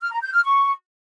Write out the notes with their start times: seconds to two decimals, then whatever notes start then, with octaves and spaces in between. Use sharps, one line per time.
0.01 F6
0.12 A#5
0.23 G6
0.33 F6
0.44 C#6